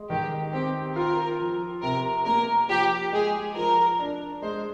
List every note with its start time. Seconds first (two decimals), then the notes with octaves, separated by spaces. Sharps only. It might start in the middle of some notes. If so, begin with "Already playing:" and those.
Already playing: G#3
0.10 D#3 G4
0.53 C4 G4
0.96 F4 A#4
1.40 F3
1.83 C3 A#4
2.26 A#3 A#4
2.70 F3 G4
3.13 G#3 G#4
3.56 F3 A#4
3.99 D4
4.42 G#3 C5